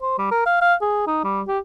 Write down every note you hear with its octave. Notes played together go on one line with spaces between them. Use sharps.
C5
G3
A#4
F5
F5
G#4
D#4
G3
G4